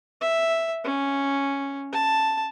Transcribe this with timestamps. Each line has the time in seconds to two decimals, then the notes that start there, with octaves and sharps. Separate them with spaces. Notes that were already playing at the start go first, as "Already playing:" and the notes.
0.21 E5
0.84 C#4
1.92 A5